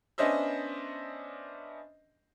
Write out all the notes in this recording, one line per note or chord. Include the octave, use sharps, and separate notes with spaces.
B3 C#4 D4 C5 D#5 E5